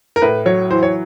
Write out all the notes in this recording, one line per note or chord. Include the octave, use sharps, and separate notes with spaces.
A#4
A2 B4
F#3 C#5
E3 C5
C#5